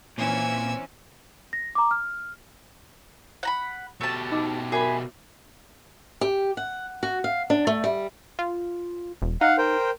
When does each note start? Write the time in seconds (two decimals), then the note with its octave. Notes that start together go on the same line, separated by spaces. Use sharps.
0.18 A#2 E3 C4 C#4 G#5 E6
1.53 A#6
1.75 A#5 D6
1.91 F6
3.43 F#5 A#5 B5
4.01 B2 A3 G4 A5
4.32 D#4 D#5 D6
4.72 F#4 G#4 A#4 E5 B5
6.21 G4
6.57 F#5
7.03 F#4
7.24 F5
7.50 D4
7.67 A3
7.84 G3
8.39 F4
9.22 E1
9.41 D#4 F5 F#5
9.58 A#4 C5 G5